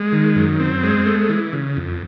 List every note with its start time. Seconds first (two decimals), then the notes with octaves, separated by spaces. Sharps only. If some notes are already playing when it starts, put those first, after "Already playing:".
Already playing: G#3
0.12 D#3
0.36 F#2
0.60 C4
0.83 G#3
1.06 A3
1.29 E3
1.53 C#3
1.77 F2